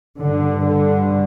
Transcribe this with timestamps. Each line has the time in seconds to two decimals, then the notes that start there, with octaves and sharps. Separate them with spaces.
0.20 G2 D3
0.67 D3